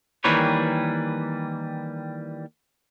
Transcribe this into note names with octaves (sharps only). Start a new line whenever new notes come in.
D#3 E3 G3 A#3 B4 C#5